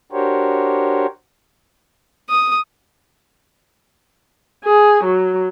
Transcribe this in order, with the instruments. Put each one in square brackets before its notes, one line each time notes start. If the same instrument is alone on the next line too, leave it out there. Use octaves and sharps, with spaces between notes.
[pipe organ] D4 F#4 G4 A#4 C5 C#5
[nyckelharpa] D#6
[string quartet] G#4
F#3